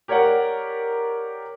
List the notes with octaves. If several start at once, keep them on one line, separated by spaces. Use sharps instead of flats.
G4 A#4 C#5 D5 F#5